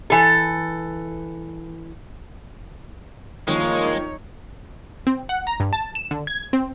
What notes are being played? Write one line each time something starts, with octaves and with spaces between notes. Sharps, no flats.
E3 A4
D#3 F3 G#3 A#3 D#4 F4 A#4 C#5
C4
F#5
A#5
G2
A5
E7
D3
G#6
C4